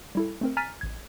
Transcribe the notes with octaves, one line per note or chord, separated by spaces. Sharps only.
G3 E4 A4
A3 C4 A#4
G#5 A#5 F6 A6 B6 D#7
A1 G#6